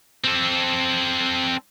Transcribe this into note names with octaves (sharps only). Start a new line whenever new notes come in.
C4 A4